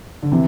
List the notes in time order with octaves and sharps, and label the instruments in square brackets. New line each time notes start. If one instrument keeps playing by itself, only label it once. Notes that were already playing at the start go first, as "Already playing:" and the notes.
[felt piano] D3
[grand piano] C3 [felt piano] E3